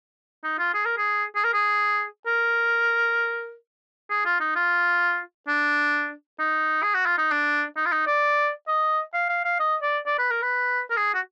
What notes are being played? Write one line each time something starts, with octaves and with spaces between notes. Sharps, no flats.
D#4
F4
G#4
A#4
G#4
G#4
A#4
G#4
A#4
G#4
F4
D#4
F4
D4
D#4
G#4
F#4
F4
D#4
D4
D#4
F4
D#4
D5
D#5
F5
F5
F5
D#5
D5
D5
B4
A#4
B4
A#4
G#4
F#4